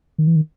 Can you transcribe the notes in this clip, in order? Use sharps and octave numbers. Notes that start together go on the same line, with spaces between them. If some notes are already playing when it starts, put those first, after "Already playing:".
D#3
E3
D#3